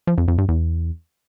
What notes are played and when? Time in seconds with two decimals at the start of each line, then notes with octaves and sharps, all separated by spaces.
0.07 F3
0.18 F2
0.28 F2
0.38 G2
0.49 E2